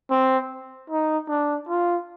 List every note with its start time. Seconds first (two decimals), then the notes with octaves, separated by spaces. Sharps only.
0.10 C4
0.90 D#4
1.28 D4
1.69 F4